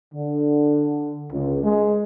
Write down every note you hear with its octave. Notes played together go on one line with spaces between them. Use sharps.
D3
C#2
G#3